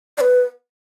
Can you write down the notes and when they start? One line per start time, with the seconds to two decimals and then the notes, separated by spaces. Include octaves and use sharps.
0.18 D5
0.21 B4